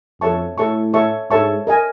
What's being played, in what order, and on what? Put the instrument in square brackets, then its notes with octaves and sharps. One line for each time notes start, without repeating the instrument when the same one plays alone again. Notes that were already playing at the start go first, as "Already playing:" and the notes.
[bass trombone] F2 [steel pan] A4 C#5 E5 A5 C#6
[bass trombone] A2 [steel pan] A4 C#5 E5 A5 C#6
[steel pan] A4 C#5 E5 A5 C#6
[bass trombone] G#2 [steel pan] A4 C#5 E5 A5 C#6
[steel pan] A#4 D#5 G#5